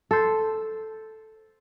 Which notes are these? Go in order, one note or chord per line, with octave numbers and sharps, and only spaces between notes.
A4 C5